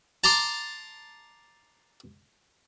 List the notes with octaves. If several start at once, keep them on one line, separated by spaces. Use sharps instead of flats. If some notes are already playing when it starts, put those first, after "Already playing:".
A5 A#5 C6 D6